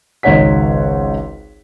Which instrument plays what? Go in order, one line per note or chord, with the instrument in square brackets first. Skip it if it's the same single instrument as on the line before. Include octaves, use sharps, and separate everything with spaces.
[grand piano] G#1 C#2 D#4 C#5 F#5 B6